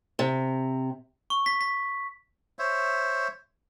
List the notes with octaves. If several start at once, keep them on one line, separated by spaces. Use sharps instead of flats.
C3
C#6
B6
B6
C5 C#5 E5